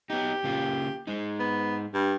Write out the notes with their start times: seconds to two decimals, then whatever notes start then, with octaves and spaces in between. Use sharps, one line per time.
0.10 B3 D#4 G4
0.44 C#3 A#3 F4
1.07 G#3 D#4
1.39 B3
1.94 G2